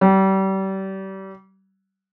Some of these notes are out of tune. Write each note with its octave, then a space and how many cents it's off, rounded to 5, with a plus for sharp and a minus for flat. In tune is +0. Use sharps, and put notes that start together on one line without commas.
G3 -30